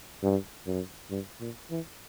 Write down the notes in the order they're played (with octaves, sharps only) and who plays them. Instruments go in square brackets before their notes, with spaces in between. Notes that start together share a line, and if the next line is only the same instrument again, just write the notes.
[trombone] G2
F#2
G2
A#2
E3